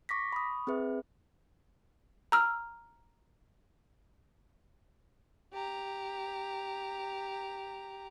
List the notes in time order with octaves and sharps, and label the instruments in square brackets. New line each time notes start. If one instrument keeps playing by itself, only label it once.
[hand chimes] C#6 D6 A#6 B6
B5 C#6 D#6
C4 G#4 B4 E5
[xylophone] A#5 E6 F6
[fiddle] G4 A#5